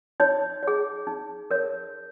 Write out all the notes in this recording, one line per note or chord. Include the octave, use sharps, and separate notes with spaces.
D#4 C#5
G#4 C#5
D#4
A#4 C#5